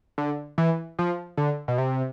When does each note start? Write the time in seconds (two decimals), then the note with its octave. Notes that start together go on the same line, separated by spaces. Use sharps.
0.18 D3
0.58 E3
0.99 F3
1.38 D3
1.68 B2
1.78 C3